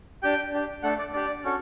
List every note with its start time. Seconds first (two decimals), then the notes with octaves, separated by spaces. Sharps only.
0.23 D4 G4 G5
0.53 D4 G4
0.83 A3 D4 A4 F#5
0.99 D5
1.13 D4 G4 D5
1.44 C#4 F#4 A4